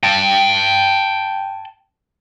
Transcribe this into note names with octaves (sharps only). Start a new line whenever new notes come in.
G5 A5